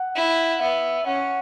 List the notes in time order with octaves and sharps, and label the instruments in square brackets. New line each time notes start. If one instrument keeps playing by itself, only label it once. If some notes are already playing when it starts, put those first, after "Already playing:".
Already playing: [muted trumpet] F#5
[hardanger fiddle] E4
[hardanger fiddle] B3 [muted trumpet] E5
[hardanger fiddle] C#4 [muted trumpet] F#5